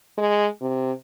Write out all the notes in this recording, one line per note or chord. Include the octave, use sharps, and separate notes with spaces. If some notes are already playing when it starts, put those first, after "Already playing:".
G#3
C3